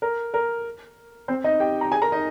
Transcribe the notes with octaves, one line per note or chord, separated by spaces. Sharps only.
A#4
A#4
C4 C5
D#4 D#5
G4 G5
A#5
G#4 G#5
A#4 A#5
D#4 D#5